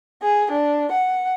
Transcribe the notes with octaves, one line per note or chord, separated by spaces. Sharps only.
G#4
D4
F#5